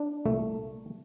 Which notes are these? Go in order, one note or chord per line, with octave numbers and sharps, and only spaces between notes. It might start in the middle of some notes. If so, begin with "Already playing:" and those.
Already playing: D4
C2 A#2 A3